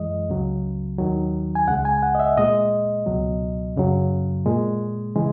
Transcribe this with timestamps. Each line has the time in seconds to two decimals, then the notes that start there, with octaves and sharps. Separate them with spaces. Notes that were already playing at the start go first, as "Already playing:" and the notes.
Already playing: F#2 E3 G#3 D#5
0.29 C#2 C#3 F#3
0.98 D#2 D#3 F#3
1.55 G#5
1.68 C#2 C#3 G#3 F#5
1.85 G#5
2.03 F#5
2.15 D#5
2.19 E5
2.37 A#2 G#3 D#5
3.06 C#2 B2 F#3
3.77 F#2 C#3 F#3
4.46 A#2 G#3
5.16 C#3 E3 G#3